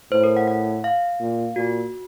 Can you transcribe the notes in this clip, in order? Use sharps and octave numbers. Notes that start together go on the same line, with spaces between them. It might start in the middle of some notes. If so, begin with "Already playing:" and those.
A2 C5
A#4
F#5
F#5
F5
A#2
A#2 F#4